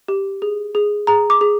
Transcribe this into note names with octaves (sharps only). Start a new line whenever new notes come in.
G4
G#4
G#4
G#4 A#5
D6
G#4